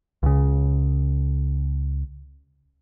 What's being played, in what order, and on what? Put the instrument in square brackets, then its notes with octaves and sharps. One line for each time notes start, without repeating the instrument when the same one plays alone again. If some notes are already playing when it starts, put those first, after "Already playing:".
[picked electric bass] C#2 C#3